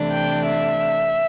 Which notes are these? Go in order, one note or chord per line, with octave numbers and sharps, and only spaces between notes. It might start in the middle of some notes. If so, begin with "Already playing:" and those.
Already playing: C3 E3 A3 D4
G5
E5